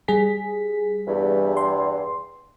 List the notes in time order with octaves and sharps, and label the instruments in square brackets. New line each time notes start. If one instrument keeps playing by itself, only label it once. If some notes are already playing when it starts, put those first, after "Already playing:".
[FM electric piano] G3 G#4 B6
[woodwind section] E2 G2
[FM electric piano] C6